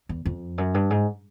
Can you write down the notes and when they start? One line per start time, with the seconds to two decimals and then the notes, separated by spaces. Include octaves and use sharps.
0.09 E2
0.25 F2
0.58 F#2
0.74 G2
0.90 G#2